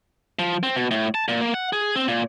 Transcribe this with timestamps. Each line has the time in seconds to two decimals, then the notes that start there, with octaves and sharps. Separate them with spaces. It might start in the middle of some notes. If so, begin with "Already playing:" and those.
0.39 F3
0.63 C4
0.76 B2
0.91 A2
1.15 A5
1.28 A#2
1.41 A#3
1.54 F#5
1.73 G#4
1.96 C4
2.08 A#2